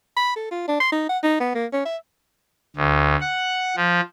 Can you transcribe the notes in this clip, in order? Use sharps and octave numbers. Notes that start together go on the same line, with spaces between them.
B5
A4
F4
D4
C6
D#4
F#5
D#4
B3
A#3
C#4
E5
D2
F#5
F3